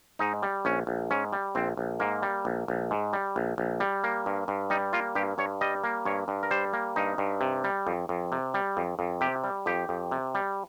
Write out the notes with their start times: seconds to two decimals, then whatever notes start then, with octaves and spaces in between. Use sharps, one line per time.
0.19 G#2 D#4
0.43 G3
0.65 A#1 C#4
0.87 A#1
1.11 G#2 C#4
1.33 G3
1.55 A#1 C4
1.77 A#1
2.00 G#2 A#3
2.23 G3
2.45 A#1
2.68 A#1
2.91 G#2
3.13 G3
3.36 A#1
3.58 A#1
3.80 G3
4.04 A#3
4.26 G2
4.48 G2
4.70 G3 D#4
4.93 A#3 F4
5.15 G2 G4
5.38 G2 C#5
5.61 G3 D#5
5.84 A#3
6.05 G2 C#5
6.28 G2
6.43 A#4
6.51 G3 C5
6.73 A#3
6.96 G2 D#4
7.18 G2
7.41 C3
7.64 G3
7.87 F2
8.09 F2
8.32 C3
8.54 G3
8.77 F2
8.99 F2
9.21 C3 G4
9.44 G3
9.66 F2 G4
9.89 F2
10.11 C3
10.35 G3